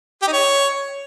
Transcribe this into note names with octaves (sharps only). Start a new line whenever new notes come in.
G4
D#4
C#5